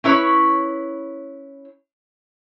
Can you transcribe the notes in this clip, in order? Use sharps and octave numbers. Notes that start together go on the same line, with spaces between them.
C#4 E4 B4 C#5